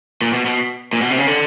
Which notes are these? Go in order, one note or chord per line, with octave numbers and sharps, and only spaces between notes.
A#2
B2
B2
A#2
B2
C3
C#3
D3